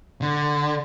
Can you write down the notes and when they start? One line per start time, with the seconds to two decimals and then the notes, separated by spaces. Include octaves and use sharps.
0.22 D3